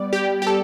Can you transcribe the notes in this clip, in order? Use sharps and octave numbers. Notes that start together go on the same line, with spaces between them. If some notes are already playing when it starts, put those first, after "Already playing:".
Already playing: G3 B3 D5
G4
G4
A4